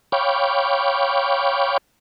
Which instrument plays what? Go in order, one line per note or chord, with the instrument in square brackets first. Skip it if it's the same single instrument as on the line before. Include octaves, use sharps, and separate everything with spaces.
[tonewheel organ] C#5 F5 G5 B5 C#6 D6